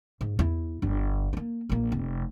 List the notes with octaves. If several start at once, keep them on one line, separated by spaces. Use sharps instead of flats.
G#2
E2 E4
G1 D4
A#3 C4
A#1 A#3
F1